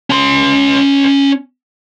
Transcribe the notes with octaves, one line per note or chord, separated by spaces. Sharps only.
C#4 C6